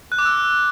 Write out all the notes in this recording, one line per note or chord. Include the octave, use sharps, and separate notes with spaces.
F#6
D6
E6